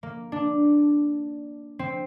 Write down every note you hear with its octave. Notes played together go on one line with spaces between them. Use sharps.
A#3
D4
C4